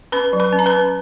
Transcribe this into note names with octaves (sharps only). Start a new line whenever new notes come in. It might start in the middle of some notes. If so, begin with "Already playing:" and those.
C#4 B4 B5
F#3
B4 B5
C#4
A#5
B4 B5
C#4